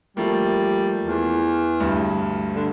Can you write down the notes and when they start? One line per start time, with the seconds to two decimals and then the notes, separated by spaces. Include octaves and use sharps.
0.17 F3 G3 A3 A#3
1.04 E2
1.80 D2 G2
2.55 D3